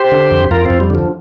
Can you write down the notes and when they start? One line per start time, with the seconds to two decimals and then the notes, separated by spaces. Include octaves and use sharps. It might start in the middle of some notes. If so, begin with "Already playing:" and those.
Already playing: G4 C5
0.12 D3
0.31 F2
0.51 F2 F4 A#4
0.65 F2 C4 F4
0.80 G3
0.90 D3 F3